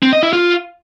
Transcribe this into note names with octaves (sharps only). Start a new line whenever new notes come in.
C4
D#5
E4
F4